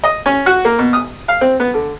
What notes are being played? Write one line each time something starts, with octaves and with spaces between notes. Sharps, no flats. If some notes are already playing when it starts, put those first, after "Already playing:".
D#5
C#4
F#4
A#3
B2
D#6
F5
C4
B3
D3